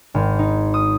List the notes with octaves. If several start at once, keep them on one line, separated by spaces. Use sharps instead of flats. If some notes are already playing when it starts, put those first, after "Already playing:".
G#1
D#4
D#6